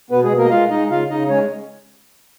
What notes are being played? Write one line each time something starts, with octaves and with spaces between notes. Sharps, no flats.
B2 B3 B4
G#3 G#4
B2
A#3 A#4
D#5
G#3 F4 F5
G#3 D#4 D#5
C#3 F4 F5
C#3 D#4 D#5
G#3 C#4 C#5